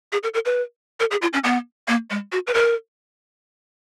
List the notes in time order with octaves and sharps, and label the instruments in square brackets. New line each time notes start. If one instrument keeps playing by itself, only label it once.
[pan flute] G#4
A#4
A#4
B4
A#4
G#4
F4
C#4
B3
A#3
G#3
F#4
B4
A#4